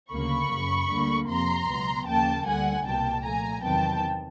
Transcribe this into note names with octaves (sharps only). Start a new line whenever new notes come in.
D2 C#3 F#3 A#3 B5 C#6
F#2 C#3 F#3
D2 D3 G3 A#3
F2 C3 F3 A#5 C6
C#2 B2 F#3 B3
D#2 C#3 F3 A#3 G5 A5
D2 D3 G3 F#5 G#5
C2 B2 G3 A#3 G5 A5
A#2 F3 A3 G#5 A#5
E2 C3 D#3 F#3 B3 G5 A5